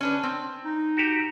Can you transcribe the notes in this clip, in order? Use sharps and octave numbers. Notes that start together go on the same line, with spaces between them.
C#4 D4 B4
C4
D#4
F#4 G4